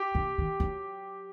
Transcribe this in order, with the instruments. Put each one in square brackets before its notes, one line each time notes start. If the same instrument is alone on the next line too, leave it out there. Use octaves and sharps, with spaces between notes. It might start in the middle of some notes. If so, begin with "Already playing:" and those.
Already playing: [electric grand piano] G4
[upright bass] A#2
D#3
F#3